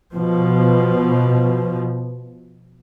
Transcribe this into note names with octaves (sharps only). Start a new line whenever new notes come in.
B2 F3